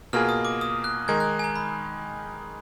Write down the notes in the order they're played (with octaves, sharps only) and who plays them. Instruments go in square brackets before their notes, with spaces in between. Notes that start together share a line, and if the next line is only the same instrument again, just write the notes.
[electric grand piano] B2 A#3 F4 G#4 [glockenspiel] F6
[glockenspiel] D#6
D6
D#6
F#6
[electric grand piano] D#3 G#3 D#4 A#4 [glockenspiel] G#6
[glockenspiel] F#6
G#5
A#5
B5